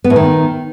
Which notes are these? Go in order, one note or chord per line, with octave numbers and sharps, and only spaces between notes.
B3
A2
D#3